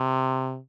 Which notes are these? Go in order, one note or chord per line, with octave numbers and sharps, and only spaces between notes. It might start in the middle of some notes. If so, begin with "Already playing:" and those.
Already playing: C3